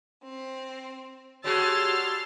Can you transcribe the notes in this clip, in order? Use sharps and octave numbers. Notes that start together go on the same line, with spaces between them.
C4
G3 F#4 G#4 C#5 A5 C6 E6 F6